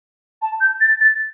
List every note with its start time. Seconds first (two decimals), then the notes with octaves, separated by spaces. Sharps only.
0.42 A5
0.60 G6
0.80 A6
1.00 A6